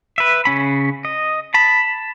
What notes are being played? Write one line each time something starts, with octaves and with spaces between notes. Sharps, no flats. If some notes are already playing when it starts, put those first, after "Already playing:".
B4 E5
C#3 C#4 B5
D#5
A5 B5